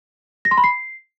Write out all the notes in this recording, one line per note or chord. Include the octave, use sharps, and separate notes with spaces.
A#6
C6
B5
C7